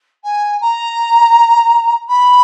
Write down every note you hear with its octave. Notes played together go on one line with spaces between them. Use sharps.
G#5
A#5
B5